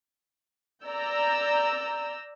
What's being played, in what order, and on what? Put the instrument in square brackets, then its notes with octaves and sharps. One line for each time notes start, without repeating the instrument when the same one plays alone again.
[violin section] D5 A#5 E6 G6